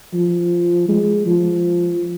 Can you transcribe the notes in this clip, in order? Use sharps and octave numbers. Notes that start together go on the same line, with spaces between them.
F3
G#3
F3